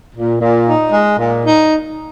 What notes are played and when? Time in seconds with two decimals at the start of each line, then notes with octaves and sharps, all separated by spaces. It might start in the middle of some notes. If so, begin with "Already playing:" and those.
0.15 A#2
0.41 A#2
0.67 D#4
0.92 G#3
1.18 A#2
1.44 D#4